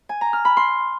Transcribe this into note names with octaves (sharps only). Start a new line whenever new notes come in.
G#5
A#5
F6
B5
C6